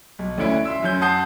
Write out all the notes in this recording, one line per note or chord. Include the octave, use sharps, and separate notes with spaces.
B1
D2 D3 C#4 E4 D7
E5 C6 E6
F#2 C#4 G6
F#5 A5 D#6 G6 C7